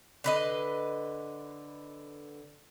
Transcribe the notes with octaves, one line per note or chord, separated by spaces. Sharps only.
D3 B4 D#5